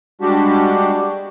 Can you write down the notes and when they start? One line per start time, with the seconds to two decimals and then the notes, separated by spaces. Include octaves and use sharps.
0.21 G3 G#3 D4 F#4 G4